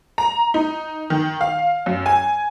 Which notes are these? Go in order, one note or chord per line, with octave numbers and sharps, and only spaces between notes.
A#5
D#4
D#3
F5
F#2
G#5